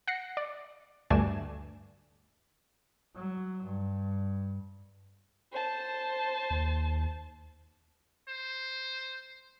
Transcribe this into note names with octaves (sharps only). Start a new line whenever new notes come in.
F#5 A#6 C7 C#7
D5
D2 G2 A3 D4 G#5 E7
F#3
G2
C5 A5
D#2
C5